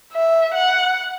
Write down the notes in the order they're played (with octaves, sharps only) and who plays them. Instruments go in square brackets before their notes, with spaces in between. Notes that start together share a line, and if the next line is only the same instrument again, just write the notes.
[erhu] E5
F#5